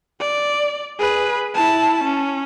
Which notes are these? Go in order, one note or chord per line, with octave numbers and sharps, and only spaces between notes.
D5
G#4 B4
E4 A5
C#4